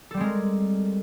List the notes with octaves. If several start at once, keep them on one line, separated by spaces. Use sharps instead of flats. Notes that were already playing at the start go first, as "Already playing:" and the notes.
G3 G#3 C4 A4 A#4